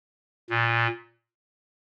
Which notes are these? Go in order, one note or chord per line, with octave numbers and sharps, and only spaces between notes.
A#2